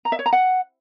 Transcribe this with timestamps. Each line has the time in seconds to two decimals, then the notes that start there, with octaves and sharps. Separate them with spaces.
0.05 A#5
0.12 E5
0.19 C#5
0.26 A#5
0.33 F#5